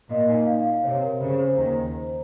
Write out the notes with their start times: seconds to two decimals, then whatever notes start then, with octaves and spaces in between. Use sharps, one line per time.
0.10 A#2 D#5
0.28 D#4
0.47 F5
0.66 F5
0.84 C3 C#5
1.02 A#4
1.21 C#3 C5
1.39 C5
1.58 D#2 D#3 A#5
1.76 C5
1.94 C5